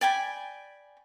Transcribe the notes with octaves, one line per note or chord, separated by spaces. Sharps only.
D5 G5 G#5 B5